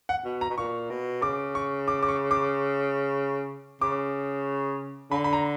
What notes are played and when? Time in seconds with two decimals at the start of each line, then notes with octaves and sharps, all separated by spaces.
0.09 F#5
0.25 B2
0.41 A#5
0.50 B2
0.57 A#2 C#6
0.90 B2
1.22 C#3 D6
1.55 C#6
1.88 D6
2.03 D6
2.08 C#6
2.31 D6
3.81 C#3 D6
5.11 D3 B5
5.24 B5
5.33 A#5